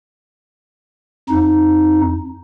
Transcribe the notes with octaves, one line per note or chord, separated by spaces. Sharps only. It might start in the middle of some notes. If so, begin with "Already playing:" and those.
F2 D#4